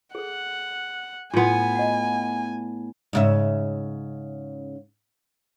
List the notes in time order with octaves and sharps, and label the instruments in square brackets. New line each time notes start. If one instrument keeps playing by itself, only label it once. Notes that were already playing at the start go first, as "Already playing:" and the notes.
[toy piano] G#4 A4 [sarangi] F#5
[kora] A2 B3 [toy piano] F4 C6 [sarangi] G#5
[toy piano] D#5 F#5
[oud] G#2 C#3 E5